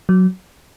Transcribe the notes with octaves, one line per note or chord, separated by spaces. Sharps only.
F#3